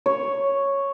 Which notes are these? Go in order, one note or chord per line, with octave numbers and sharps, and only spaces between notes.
C#5